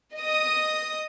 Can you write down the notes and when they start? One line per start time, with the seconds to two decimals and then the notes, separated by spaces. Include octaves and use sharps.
0.16 D#5 D#6